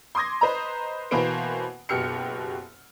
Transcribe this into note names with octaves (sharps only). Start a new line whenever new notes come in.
C6 D6 D#6 G#6 A#6
B4 C5 D#5 A#5
B2 E3 A#3 B4 C5 D7
F#1 B2 G4 F6 C#7